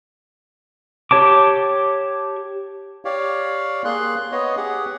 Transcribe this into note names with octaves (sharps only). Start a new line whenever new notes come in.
G4 C#5 A5 D6
G4 C#5 D5 F5
A#3 G#4 C6 F#6
B3 C#5 D#5
G4 G#4 F#5